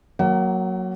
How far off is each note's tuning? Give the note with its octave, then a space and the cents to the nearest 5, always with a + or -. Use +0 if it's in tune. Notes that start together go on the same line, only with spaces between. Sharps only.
F#3 +0 A#3 +0 F#5 +35